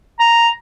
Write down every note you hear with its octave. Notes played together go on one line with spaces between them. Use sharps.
A#5